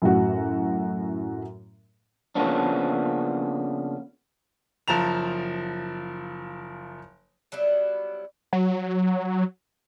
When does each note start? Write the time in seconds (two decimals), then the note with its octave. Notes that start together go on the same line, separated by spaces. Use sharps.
0.02 F#2 A2 F#4
2.35 C#3 F3 A#3 B3 C#4 D4
4.88 F#1 F3 A5 A#5 F7
7.52 F#3 G3 B3 E4
8.53 F#3